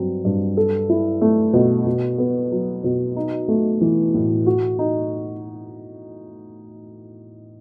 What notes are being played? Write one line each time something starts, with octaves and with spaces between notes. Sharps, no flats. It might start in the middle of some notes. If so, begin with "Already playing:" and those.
Already playing: G2 F#3 C4
G2
A4
E4
A3
B2
B2
B3
F#3
B2
D#4
A3
E3
A2
F#4
D#4